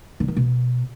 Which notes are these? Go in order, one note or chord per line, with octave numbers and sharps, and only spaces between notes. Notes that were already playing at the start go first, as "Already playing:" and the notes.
D3
D#3
B2